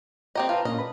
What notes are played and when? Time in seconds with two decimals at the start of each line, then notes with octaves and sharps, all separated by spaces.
0.35 C4 G4 D#5 A#5
0.49 F4 B4 A5 A#5
0.65 A#2 C#4 D#5
0.78 B4 B5